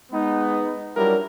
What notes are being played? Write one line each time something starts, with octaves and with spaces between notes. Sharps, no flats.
G#3 B3 D#4
F#3 G3 D4 E4 F4 A#4